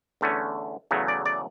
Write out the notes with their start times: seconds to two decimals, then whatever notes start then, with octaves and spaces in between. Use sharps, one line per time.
0.21 E2 D3 A3 C#4
0.91 E2 C#3 F#3 A3
1.08 D5
1.26 D5